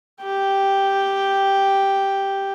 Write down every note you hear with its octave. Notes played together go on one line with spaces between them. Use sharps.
G4 G5